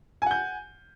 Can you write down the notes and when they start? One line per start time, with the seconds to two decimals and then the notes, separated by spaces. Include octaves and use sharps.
0.22 G#5
0.26 F#5
0.31 G6